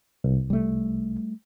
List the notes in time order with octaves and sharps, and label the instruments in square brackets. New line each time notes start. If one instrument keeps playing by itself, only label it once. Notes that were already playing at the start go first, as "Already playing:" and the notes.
[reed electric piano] C2
[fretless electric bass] G3 A3